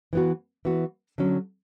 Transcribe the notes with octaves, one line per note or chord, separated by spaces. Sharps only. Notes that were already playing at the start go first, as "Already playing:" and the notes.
E3 B3 F#4
E3 B3 F#4
D3 F#3 C#4